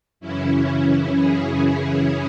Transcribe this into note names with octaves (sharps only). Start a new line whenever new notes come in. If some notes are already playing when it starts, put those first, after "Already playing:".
F#2 C#3 E3 C#4 E4
E4 G#4